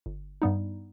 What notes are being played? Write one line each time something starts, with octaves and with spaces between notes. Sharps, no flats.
G1
G2 G3 B3 D#4